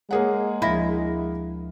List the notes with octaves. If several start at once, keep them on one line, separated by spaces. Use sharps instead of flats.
G#3 A#3 G#4 C#5 F#5
D2 F3 E4 A#6